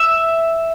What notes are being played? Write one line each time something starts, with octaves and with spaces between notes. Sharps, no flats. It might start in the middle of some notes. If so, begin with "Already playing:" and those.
Already playing: E5